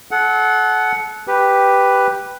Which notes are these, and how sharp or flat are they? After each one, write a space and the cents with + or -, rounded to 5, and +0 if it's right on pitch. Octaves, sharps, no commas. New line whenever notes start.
A4 -35 F#5 +0
G4 +0 B4 +0